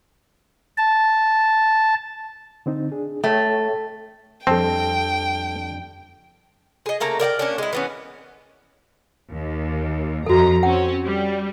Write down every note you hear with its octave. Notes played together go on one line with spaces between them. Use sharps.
A5
D3 C4 D#4
D4 G#4
A3 C#5 G5
F2 G3 C4 D4 A4 G5 A5
G#4 D#5
C#3 A3 A#3 A#5
A#4 D5 F5 G5
A#3 C#4 D4
G#3 E4
E3 B3 C#4
D#2
F2 F#4 A4 A#5
C4 C#4 F#5
G3